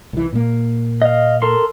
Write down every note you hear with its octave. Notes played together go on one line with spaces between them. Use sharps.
C2 E3
A#2 A#3
D#5 F5
A4 A#4 C6